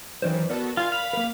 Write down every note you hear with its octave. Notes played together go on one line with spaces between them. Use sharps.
F#2 D#3 E3 C5 D5
B3 F#4 A4 A#4 D5
F4 F5 G#5
F5 B5
A#3 A#4